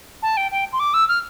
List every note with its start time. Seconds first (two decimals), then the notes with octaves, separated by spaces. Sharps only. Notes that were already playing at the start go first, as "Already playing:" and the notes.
0.23 A5
0.37 G5
0.52 G5
0.73 C6
0.79 D6
0.94 E6
1.08 F6